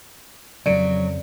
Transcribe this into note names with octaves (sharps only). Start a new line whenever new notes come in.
F2 C#3 F#3 D5